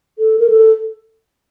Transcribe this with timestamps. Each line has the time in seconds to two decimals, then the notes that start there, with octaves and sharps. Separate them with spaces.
0.18 A4
0.39 A#4
0.49 A4